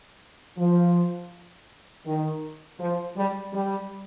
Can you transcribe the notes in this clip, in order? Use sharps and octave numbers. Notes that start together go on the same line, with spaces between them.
F3
D#3
F3
G3
G3